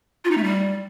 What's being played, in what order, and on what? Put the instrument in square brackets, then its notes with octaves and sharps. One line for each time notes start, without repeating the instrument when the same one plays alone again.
[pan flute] F4
D#4
A3
G3